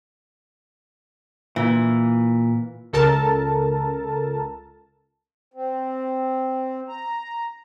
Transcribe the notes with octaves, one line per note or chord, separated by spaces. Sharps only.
A#2 E3
C#2 A4 A#4 A5
C4
A#5